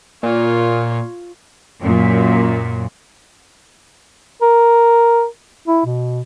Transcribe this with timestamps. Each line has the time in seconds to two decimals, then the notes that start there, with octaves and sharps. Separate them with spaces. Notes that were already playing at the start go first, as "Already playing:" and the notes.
0.23 A#2 F4 C#5
1.80 F#2 A#2
4.42 A#4
5.68 E4
5.86 B2